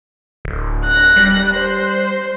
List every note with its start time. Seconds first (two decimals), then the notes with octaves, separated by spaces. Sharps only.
0.45 D1
0.85 F#6 A#6
1.16 G3
1.54 C5